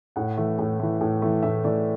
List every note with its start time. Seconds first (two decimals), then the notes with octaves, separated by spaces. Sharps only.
0.16 A2 F#5
0.38 E3 A3
0.59 A2
0.80 E3 A3
1.01 A2
1.22 E3 A3
1.43 A2 E5
1.64 E3 A3 D5